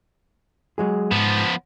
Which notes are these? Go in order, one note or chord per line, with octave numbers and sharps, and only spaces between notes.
F#3 G#3 G#4
G#2 F3 B3